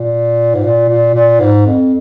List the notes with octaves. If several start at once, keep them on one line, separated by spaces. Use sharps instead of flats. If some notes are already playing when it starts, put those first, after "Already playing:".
Already playing: A#2
G#2
A#2
A#2
A#2
G#2
F2